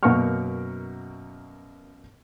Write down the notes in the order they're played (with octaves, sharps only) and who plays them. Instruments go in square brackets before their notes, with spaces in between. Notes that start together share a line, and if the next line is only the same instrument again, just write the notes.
[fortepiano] F#2 B2 A#3 F#5 C#6 F6